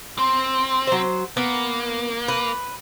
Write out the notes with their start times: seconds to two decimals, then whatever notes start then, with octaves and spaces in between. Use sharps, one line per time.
0.19 C4
0.87 F#3 C5
1.37 A#3 B3
2.28 B4